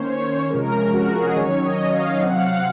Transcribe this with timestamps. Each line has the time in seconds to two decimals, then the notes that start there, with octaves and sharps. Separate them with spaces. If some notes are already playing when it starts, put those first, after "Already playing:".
Already playing: D#3 A#3 C#4 C5 C#5
0.13 C#5
0.21 C5
0.50 C3 F3 G#3 C#4 A#4
0.72 A#4
0.93 F#4
1.15 G#4
1.29 D#5
1.36 D#3 F#3 C#4 C#5
1.65 D#5
1.93 F5
2.22 C3 F#3 C4 F#5
2.35 F5
2.44 F#5